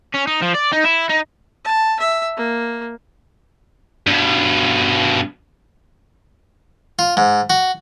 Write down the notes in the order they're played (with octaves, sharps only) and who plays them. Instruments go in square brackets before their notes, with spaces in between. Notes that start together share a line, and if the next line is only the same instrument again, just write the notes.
[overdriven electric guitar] C#4
D#4
F3
D5
D#4
E4
D#4
[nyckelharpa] A5
E5
A#3
[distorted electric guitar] G2 B2
[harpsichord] F4
G#2
F#4